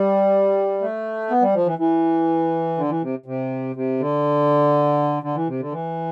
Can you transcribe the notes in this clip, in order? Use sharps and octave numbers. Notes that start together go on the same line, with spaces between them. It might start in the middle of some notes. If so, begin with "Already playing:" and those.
Already playing: G3
A3
B3
G3
F3
E3
E3
D3
E3
C3
C3
C3
D3
D3
E3
C3
D3
E3